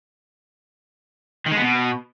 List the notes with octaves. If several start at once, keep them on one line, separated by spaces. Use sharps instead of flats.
D#3
G#3
B3
B2